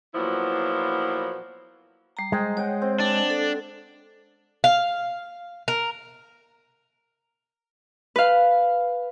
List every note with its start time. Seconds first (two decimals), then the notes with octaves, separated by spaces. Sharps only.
0.14 A#2 F3 F#3 B3 E4
2.17 G3 A#5
2.32 G#3 C5 D#5 G5
2.57 C#5 F#5 G5
2.82 C4
3.00 D4
3.30 A4
4.64 F5
5.68 A#4
8.16 B4 F5